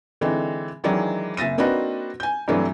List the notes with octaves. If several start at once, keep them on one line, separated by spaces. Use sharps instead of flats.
D3 E3 G#3 C4 D#4
D#3 E3 F#3 G#3 D4
F#1 E5 A6 A#6 D#7
A#3 C4 D4 D#4 F#4 B4
G#5 G6
G2 C3 E3 F#3 A3 D4